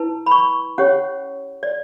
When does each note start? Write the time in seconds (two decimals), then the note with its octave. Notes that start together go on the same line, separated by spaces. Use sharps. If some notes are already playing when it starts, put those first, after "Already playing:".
Already playing: E4 B4 A5
0.26 B5
0.31 C#6
0.78 C#4 G4 C#5 F#5
1.63 D5